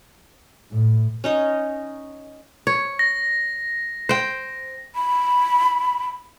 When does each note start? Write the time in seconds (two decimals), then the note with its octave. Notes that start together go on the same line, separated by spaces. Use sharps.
0.72 A2
1.24 C#4 D#4 D#5
2.67 C#5
2.99 A#6
4.09 C5 G5
4.95 B5